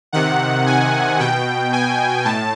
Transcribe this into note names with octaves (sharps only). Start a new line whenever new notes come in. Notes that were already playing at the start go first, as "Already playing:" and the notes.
C3 D#3 F#5
G#5
B2 G5
G#5
A2 A5